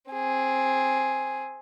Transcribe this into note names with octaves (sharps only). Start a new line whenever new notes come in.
C4 G#4